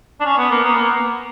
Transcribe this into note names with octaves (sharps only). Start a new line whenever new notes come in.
D4
C#4
B3
A#3
B3
A#3